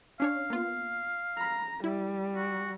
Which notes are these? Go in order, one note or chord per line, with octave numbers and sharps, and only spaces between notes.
C#4 D4 C#5 F5
A#3 B3 F4
A#5 B5 F6
G3 E4
F#4